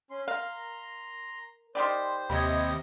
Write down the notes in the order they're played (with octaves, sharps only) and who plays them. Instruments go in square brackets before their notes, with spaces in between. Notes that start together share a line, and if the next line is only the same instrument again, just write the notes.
[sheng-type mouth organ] C#4 C6
[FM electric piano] A#4 [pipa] F5 [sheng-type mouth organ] A#5 C6
[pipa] D#3 G4 D5 [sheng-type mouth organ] C5 [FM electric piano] B5 C6
[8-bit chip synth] D#2 C3 D#5 [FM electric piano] B5 G#6